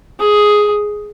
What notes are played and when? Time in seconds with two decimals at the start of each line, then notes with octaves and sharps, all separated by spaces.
0.20 G#4